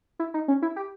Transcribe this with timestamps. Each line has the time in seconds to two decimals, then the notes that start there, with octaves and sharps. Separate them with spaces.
0.19 E4
0.34 D#4
0.48 C#4
0.62 E4
0.76 G4